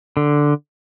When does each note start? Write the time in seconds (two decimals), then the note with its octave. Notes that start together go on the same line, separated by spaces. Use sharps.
0.17 D3